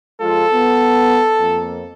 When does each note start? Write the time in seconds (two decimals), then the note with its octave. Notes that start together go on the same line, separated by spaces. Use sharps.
0.21 F3 G#3 F4 A4
0.53 B3
1.40 F2 A#3